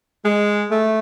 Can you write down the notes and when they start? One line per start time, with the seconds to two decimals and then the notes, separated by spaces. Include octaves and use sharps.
0.25 G#3
0.70 A3